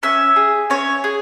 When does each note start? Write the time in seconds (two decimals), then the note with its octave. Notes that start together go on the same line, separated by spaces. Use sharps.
0.03 C#4 E5
0.36 G#4
0.70 C#4 C#5
1.04 G#4